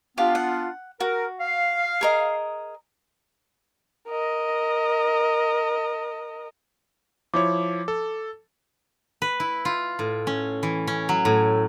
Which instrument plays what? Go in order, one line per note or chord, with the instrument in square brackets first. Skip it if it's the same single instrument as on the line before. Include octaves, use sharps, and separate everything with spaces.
[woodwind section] B3 D4 F4 [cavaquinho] G4 F5
[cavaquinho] F#5
[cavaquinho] F#4 [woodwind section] A#4
[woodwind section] F5
[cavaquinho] G#4 A#4 D#5
[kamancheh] A#4 D#5
[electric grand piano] F3 E4 C#5 [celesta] D6
[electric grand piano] A4
[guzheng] B4
E4
F4
A2
C#4
E3
C#4
F#3
A2